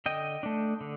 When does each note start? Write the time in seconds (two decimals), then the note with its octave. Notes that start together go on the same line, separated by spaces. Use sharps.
0.06 D3 D#5 G5
0.43 A3 D4
0.81 D3